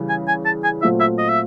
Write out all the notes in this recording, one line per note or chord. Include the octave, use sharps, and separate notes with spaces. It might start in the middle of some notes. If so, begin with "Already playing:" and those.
Already playing: C#3 E3 G3
G#5
G#5
A5
G#5
A#2 F#3 A3 C4 F4 E5
E5
D#5
E5